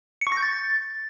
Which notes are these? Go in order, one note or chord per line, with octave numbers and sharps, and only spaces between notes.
C#7
C#6
A#6
G6
A6